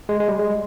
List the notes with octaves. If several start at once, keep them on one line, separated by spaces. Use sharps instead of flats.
G#3
G#3
G3
G#3